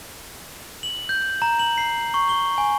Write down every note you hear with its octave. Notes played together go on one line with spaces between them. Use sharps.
F#7
G6
A#5
F#7
C7
C#6
G7
G#5